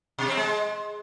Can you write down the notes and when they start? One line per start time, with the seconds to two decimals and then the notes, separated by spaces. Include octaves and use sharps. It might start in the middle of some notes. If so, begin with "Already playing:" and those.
0.18 B2
0.28 C4
0.37 G#3